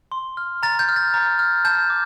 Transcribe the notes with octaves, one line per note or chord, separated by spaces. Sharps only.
C6
F6
A#5 A6
G6
F6
A6
A#5
F6
A5 G6
D6